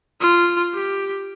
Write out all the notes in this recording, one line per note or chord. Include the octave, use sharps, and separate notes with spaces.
F4
G4